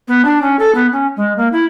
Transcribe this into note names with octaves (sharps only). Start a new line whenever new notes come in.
B3
D4
C#4
A4
B3
C#4
G#3
A#3
E4